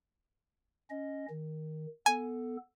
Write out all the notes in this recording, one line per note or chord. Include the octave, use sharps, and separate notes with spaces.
C#4 D#5
D#3
B3 A4 G#5